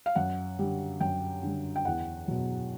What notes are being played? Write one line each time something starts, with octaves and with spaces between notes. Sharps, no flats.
F5
F#2 F#5
D3 G3
F#2 G5
D3 G3
G5
E2 F#5
B2 F#3